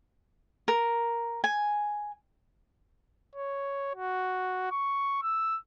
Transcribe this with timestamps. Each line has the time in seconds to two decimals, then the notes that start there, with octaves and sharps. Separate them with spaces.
0.68 A#4
1.44 G#5
3.36 C#5
3.95 F#4
4.71 C#6
5.23 E6